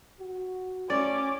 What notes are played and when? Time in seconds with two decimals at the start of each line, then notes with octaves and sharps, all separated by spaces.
0.20 F#4
0.90 A2 C#4 D5 D6